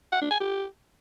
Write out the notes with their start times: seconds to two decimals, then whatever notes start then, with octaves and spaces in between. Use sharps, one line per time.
0.12 F#5
0.21 D4
0.31 G#5
0.40 G4